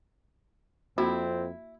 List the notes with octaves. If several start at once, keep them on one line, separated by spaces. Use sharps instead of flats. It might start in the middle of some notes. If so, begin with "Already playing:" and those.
F2 A#3 C4 E4 F#4